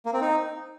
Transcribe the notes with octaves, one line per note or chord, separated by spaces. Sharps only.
A#3
C4
D#4